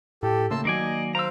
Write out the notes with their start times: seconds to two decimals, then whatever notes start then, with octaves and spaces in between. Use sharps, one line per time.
0.23 A2 G4 A4
0.51 C#3 A3 A#3 A5 C6 E6
0.65 D#3 F#3 A#3 D5 D#5 G#5
1.15 C5 F5 A#5 E6